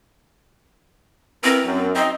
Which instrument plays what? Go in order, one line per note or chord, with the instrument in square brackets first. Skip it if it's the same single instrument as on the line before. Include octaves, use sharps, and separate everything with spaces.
[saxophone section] B3 E4 A#4 [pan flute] C4
[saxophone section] F#2
[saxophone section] C4 D#4 [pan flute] D#5